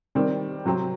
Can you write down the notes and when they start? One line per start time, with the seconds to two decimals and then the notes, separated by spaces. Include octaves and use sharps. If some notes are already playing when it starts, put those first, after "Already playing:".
0.15 D#3 G3 C4
0.65 C3 F#3 C4